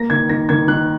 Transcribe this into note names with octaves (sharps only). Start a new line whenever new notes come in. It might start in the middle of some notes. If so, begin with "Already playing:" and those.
Already playing: A#3 A#6
D#3 G#6
D#3 A#6
D#3 G#6
D#3 F#6